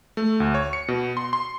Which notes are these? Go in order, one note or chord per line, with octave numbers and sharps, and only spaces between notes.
A3
D2
C#5
C#7
B2
C6
C6